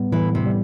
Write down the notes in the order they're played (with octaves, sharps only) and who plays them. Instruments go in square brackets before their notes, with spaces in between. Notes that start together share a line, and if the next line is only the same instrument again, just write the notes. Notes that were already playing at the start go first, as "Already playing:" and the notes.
Already playing: [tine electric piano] A2 G3 B3
[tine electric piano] A2 [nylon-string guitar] E3
[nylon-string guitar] C3
[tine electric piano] G3